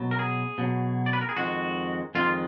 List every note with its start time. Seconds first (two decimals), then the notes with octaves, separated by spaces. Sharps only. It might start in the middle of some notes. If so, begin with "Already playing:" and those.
Already playing: B2 F#3
0.11 A#4
0.19 G#4
0.58 B2 F#3
1.06 D5
1.13 B4
1.21 A#4
1.29 G#4
1.36 F2 D#3 G#3 F#4
2.15 F2 D#3 G#3 F4